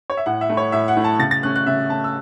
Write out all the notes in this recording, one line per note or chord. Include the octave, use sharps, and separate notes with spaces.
C#5
E5
A2 F#5
E5
A3 E4
C#5
A2 E5
F#5
A3 E4
A5
C#3 A6
A6
A3 C#4 F#6
F#6
C#3 E5
A3 C#4 A5
E6